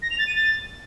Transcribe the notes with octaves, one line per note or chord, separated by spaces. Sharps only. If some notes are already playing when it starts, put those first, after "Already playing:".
A#6
F7
A6
D#7
A6